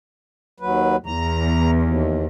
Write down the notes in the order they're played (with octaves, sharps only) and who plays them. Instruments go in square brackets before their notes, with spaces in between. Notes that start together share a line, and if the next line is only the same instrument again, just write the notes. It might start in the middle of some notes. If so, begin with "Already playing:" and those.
[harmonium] D#2 F#3 B4
[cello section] E2 [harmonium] A#5
[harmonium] D#2